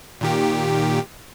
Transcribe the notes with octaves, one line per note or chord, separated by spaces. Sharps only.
A#2 D#3 G4